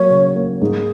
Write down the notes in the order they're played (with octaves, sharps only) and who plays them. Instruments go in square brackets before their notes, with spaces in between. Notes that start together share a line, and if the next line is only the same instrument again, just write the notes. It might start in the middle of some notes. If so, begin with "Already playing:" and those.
Already playing: [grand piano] F#3 A#3 [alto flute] C#5
[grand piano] C#3
A#3
[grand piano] G#2 [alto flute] G#4